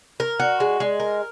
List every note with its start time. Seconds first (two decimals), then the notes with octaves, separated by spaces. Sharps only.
0.20 A#4
0.40 F#4
0.60 G#3
0.80 G#3
1.00 A#4